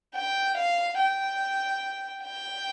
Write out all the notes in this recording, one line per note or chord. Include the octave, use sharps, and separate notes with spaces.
G5
F5
G5
G5